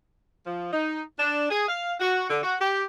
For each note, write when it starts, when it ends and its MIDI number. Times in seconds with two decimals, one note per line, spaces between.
0.46 0.72 53
0.73 1.02 63
1.19 1.49 62
1.51 1.67 68
1.69 1.94 77
2.00 2.27 66
2.30 2.40 50
2.43 2.54 66
2.61 2.84 67